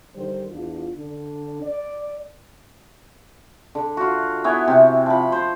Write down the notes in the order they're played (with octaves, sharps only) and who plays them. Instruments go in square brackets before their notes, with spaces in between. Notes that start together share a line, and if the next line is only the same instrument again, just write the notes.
[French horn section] D3 D#3 G3 C5
E2 D4 F4
D3 D4
D5
[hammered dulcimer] D3
F4 F#4
B3 E4 C#5 G#5
C3 C4
F3 B5
C5 C6